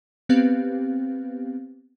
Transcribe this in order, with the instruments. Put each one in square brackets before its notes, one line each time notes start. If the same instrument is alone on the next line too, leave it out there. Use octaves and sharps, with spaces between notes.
[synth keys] B3 C4 G4 B4 F5